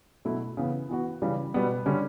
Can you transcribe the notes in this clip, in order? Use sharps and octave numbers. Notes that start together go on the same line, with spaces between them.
B2 F#3 A3 E4
C#3 E3 B3
E3 B3 F#4
C#3 E3 G3
B2 G3 B3
D3 G3 C#4